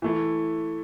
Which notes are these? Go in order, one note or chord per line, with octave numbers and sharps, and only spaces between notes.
E3 A3 E4